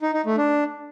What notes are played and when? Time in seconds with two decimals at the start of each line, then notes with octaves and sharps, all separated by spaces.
0.02 D#4
0.14 D#4
0.26 A3
0.38 D4